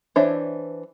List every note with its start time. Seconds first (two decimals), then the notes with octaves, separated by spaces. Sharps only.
0.16 E3 D4 C5 C#5 E5